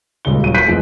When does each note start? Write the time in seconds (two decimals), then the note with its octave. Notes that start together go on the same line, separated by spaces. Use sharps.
0.25 D#1 C#2 G#3 G7
0.43 D#1 F#3 D#7
0.54 F#6 G6 B6 C7 D7 D#7
0.66 F2 E3 G#3 A3